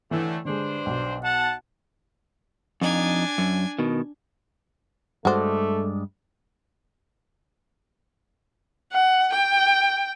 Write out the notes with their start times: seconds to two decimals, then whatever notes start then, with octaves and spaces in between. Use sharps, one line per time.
0.11 A2 D3 E3 A3
0.45 G2 D3 G#3 D4 C5
0.86 B1
1.24 F#5 A5
2.82 F2 D4 D#4 G#5
3.38 F#2
3.79 B2 D#3
5.25 G2 G#3 A3 F#4 C5 D5
8.93 F#5
9.33 G5